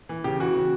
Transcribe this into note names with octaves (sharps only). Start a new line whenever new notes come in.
E3
C#3 G4
E3 F#4
C#3